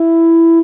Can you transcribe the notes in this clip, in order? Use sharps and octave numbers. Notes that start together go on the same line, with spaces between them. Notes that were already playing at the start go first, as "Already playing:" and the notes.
Already playing: E4